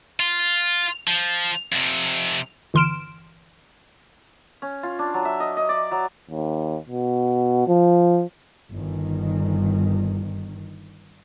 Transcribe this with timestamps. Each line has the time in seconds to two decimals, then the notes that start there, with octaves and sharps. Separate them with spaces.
0.20 F4
1.08 F3
1.72 F2 C3
2.74 G1 E3 C6 F6 D7 E7
4.62 C#4
4.83 F4
4.99 D4
5.14 F#3
5.25 E5
5.40 D#5
5.57 D#5
5.69 D5
5.91 F#3
6.30 D#2
6.89 B2
7.68 F3
8.72 G1 D#3